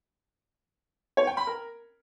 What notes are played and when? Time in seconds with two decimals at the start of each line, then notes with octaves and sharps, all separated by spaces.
1.17 C#5
1.27 G5
1.37 B5
1.47 A#4